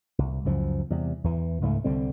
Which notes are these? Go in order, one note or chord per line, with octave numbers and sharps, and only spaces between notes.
C2
C#2 F#2 F3
E2 C3 G3
E2 E3
C#2 G#2 F#3 A3
C2 D3 G3 C4